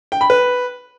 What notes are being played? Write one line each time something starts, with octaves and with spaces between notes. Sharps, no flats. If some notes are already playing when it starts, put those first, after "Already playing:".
G5
B5
B4